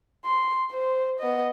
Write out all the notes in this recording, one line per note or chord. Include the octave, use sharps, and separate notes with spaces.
C6
C5
B3 D#5